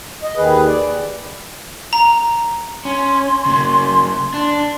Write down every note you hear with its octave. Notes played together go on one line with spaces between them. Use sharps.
D#5
D#2 D#3 G#4 B4
D5
A#5
C#4 C6
C#3 A#3
D4